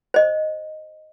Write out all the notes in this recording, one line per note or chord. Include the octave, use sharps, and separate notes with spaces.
C5 D#5